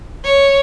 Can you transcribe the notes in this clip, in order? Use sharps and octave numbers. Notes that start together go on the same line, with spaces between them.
C#5